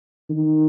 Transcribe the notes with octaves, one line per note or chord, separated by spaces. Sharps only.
D#3